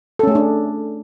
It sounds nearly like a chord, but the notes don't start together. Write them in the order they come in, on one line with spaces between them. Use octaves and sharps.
A4 C#4 A3 G#4 D4